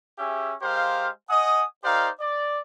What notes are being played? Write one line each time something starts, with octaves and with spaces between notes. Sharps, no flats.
C#4 G4 G#4 E5
G#3 G4 A#4 C5 F5
D#5 F#5 G#5 D#6
D#4 G4 A#4 C5 D5 F5
D5